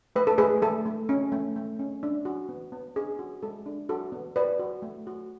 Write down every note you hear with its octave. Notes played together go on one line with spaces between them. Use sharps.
A3 B4
A4
A3 G#4 B4
A3 A4
A3
C#4
A3
A3
C#4
D4
F#4
B3
B3
D4 G#4
F#4
G#3 A4
D4
F#4 A4
B3
F#4 B4 D5
F#4
A3
F#4